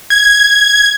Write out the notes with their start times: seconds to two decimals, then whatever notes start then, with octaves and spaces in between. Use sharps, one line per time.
0.10 G#6